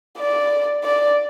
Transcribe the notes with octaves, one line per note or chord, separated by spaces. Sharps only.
D5
D5